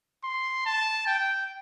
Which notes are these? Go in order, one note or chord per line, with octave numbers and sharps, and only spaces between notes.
C6
A5
G5